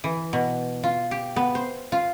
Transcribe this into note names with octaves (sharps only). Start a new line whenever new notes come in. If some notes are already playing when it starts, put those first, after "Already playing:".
E3
B2
F4
G4
B3
C5
F4